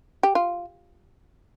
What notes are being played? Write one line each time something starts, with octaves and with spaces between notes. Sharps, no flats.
G4
F4